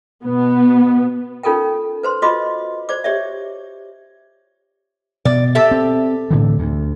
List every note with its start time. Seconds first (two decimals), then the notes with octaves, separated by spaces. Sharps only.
0.24 B2 B3
1.43 C#4 D#4 F4 A4 A#4 G5
2.03 B4 C5 C6
2.22 F4 F#4 D#5 C6 D6
2.89 C5 D5 D6
3.04 G4 C#5 D5 E5
5.25 B2 D5
5.55 G4 A4 E5
5.71 C4
6.31 A2 D3 E3
6.59 D2